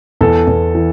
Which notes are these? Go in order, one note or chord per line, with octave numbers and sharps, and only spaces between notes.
E2 A4
E2
E3